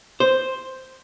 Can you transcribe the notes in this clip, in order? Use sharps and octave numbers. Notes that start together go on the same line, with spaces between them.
C5